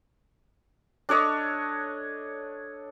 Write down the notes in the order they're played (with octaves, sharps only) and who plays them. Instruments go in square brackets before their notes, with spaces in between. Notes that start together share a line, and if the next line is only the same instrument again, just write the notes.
[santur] D4 A4 C#5 D#5